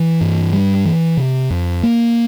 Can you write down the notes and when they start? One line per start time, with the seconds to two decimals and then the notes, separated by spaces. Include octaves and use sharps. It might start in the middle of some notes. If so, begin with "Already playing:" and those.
Already playing: E3
0.21 G2
0.53 G3
0.85 E3
1.17 C3
1.50 F2
1.83 A#3